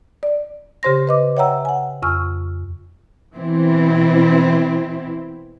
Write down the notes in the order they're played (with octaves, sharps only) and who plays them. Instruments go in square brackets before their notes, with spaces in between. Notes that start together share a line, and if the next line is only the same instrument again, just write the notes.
[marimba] D5
C#3 G4 C5 C6 A#6
B4 D#5 D6
C#5 E5 F#5 G5 A#5 E6
F#5 G#5
F2 G#5 C#6 E6 F6
[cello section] B2 E3 C4 E4